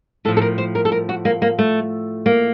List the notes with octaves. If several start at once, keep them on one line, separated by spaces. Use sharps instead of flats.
A2 F3 A4
A4
A#4
C5
A#4
A4
A#4
F#4
A#3
A#3
A3
A#3